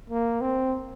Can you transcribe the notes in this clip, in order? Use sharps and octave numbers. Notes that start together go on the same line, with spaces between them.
A#3
C4